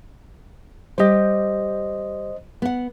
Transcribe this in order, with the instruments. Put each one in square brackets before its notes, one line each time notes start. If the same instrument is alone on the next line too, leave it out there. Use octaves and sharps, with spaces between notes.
[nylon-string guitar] G3 G4 [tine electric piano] C5 D#5
[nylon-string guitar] B3 F#5